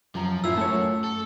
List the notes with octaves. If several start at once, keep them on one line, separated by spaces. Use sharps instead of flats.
F#2 F3 A#5
F#2 A2 F#3 E4 F4 E6
A3 C#5 A5
A4